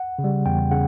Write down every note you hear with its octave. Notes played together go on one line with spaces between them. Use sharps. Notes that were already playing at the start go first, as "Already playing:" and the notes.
Already playing: F#5
C#3
G3
E2 G5
C#3 F#5